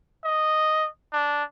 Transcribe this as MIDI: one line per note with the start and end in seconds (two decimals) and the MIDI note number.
0.24 0.88 75
1.13 1.43 62